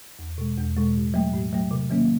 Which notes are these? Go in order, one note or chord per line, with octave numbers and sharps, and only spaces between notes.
E2
B2 G#3
E2
B2 G#3
A2
F#3 A3
A2
F#3 A3
C3
D#3 F#3 A#3 C#4